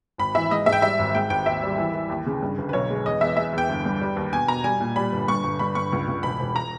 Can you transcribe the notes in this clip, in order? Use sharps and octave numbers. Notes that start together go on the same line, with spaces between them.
G#1 B5
E3 E5
G#2 D#5
G#2 E5
G5
G3 E5
G#1
G#2 G5
G#1 G5
D#2 E5
G3
E3
E3
D#2
C#3
G2
G1
B4
B1 C#5
G#3
E2 D#5
E2 E5
G#3 E5
E2 G5
G1
G2
G3
D#2
B2 G#5
B2 A#5
G3 G#5
A#2
G3 B5
G1
G2 C#6
G1
G2 B5
G2 C#6
C#2
C#2
E1 B5
E1
A#5